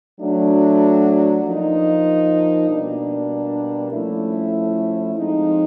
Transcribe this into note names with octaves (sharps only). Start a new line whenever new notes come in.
F#3 A3 D4
F3 A#3 D#4
B2 G3 A#3 D4
F3 A3 C#4 E4
F3 G#3 C4 D#4